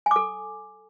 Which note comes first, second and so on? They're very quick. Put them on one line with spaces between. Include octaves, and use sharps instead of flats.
G#5 D6 A4